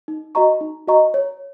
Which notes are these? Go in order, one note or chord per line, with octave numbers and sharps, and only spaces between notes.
D#4
F#4 D#5 A#5 C#6
D#4
F#4 D#5 A#5 C#6
C#5